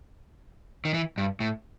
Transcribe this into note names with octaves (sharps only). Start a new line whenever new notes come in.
D#3
E3
G2
A2